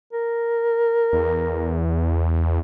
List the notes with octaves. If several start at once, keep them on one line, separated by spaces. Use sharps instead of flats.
A#4
E2